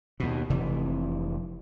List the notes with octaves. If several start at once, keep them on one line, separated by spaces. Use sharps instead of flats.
D#2 B2
F1 C3 E3